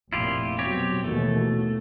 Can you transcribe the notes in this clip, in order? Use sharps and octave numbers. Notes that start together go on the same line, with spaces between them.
F1 A#2 E4 F4 G4
B2 F#3 C4 G4 C#5
D#2 B2 E3 A3